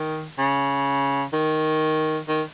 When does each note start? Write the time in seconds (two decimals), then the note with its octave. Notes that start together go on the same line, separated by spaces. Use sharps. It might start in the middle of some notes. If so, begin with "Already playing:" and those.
Already playing: D#3
0.38 C#3
1.33 D#3
2.28 D#3